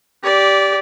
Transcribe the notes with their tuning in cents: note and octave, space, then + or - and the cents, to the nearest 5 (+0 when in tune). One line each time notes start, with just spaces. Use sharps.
G4 +0 D5 -15